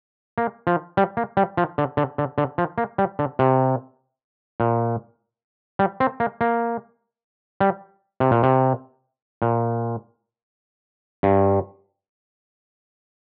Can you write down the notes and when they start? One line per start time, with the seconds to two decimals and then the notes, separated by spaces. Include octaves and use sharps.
0.38 A#3
0.67 F3
0.97 G3
1.17 A#3
1.37 G3
1.57 F3
1.78 D3
1.97 D3
2.18 D3
2.38 D3
2.58 F3
2.78 A#3
2.98 G3
3.19 D3
3.39 C3
4.60 A#2
5.79 G3
6.00 C4
6.20 A#3
6.41 A#3
7.60 G3
8.20 C3
8.31 A#2
8.43 C3
9.42 A#2
11.23 G2